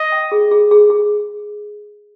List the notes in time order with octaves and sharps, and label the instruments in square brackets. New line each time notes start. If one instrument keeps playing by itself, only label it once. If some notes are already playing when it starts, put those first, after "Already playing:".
Already playing: [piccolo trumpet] D#5
[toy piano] G5
G#4
G#4
G#4
G#4